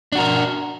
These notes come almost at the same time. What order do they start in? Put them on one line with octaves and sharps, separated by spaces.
D4 F#4 A#4